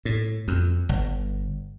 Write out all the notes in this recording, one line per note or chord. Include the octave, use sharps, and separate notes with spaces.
A2
F2
G1